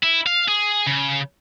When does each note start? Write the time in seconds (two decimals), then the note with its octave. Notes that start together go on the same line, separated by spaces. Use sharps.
0.03 E4
0.27 F5
0.48 G#4
0.86 C#3